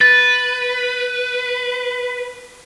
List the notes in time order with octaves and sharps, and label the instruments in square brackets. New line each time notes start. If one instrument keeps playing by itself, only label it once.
[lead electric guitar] B4 [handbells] A6